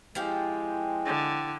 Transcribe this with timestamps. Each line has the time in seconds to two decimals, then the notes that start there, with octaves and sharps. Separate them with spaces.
0.15 F3 G#3 C4 E4 G4
1.05 D3